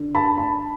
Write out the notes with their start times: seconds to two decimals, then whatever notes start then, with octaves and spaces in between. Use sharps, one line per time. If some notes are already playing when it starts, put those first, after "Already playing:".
Already playing: D3
0.15 A5 B5
0.38 A5 B5